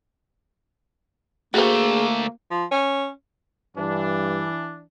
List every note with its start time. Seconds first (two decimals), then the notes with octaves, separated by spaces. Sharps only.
1.54 D2 A3 A#3 F#4 G#4 C5
2.51 F3
2.71 C#4
3.77 G2 E3 D4